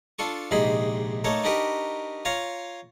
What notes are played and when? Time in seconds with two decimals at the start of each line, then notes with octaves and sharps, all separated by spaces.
0.19 D4 F4 A4 C#6
0.51 A#1 G#2 C3 D#4 G#4 B5
1.24 A3 A#3 D#4 A4 C#5
1.44 D4 D#4 F#4 G4 A#4 B4
2.25 F4 C#5 F5 A#5